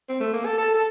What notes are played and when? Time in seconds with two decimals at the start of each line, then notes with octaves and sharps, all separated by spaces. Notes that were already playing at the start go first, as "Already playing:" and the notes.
0.09 C4
0.20 A3
0.33 A#3
0.46 A4
0.58 A4
0.74 A4